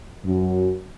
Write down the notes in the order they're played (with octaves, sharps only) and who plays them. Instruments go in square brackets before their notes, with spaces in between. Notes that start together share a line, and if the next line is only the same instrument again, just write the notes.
[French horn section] F#2